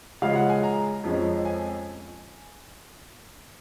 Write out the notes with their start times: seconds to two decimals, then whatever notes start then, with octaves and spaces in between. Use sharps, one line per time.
0.22 C#3 F3 G#3 C#4 F5
0.36 F#5
0.50 G#5
0.63 A#5
1.04 F2 F3 G#3 C#4
1.45 G#5